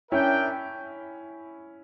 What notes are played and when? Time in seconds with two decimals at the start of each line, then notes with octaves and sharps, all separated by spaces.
0.11 C#4 D4 E4 A#4 E5 G5